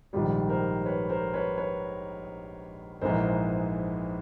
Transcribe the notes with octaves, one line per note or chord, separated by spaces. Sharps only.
A#1 G#2 D#3 G3 F4 G4
A#4 C5
B4 C#5
A#4 C5
B4 C#5
B4 C#5
A#1 G#2 E3 G#3 A#4 C5